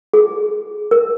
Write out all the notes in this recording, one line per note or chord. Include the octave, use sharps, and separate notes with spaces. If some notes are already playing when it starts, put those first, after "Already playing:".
G#4
A#4